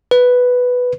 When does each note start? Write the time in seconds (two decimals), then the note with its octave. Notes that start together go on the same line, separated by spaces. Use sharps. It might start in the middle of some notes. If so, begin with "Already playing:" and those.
0.11 B4